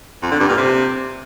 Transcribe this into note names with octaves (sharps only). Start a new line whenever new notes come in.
F2
D3
G2
A#2
C3